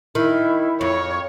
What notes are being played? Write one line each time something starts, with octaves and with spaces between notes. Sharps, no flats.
D#3 E4
F2 C#5